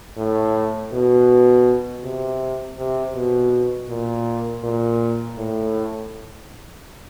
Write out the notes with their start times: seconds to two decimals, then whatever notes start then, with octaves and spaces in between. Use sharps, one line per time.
0.17 A2
0.92 B2
2.04 C3
2.78 C3
3.15 B2
3.89 A#2
4.64 A#2
5.38 A2